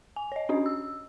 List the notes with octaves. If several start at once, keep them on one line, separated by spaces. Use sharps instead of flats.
G#5
C#5 D#5
C#4 D4 F#4 D#5
E6